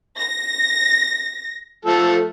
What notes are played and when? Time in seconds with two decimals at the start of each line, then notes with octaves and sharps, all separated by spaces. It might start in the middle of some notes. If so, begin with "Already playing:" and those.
0.18 A#6
1.85 F3 A3 A4